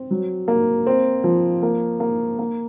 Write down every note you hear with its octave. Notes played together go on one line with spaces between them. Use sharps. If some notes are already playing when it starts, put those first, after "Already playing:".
Already playing: C4
F#3
A#3
C4
F3
A#3
A#3
A#3